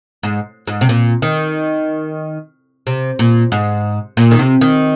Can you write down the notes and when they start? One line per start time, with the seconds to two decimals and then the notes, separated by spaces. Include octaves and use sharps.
0.23 G#2
0.67 G#2
0.81 C3
0.89 A#2
1.22 D#3
2.87 C3
3.19 A#2
3.52 G#2
4.17 A#2
4.31 D#3
4.39 C3
4.61 D#3